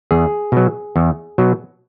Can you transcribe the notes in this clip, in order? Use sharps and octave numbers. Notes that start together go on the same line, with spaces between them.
E2 G#4
B2 F#3
E2
B2 F#3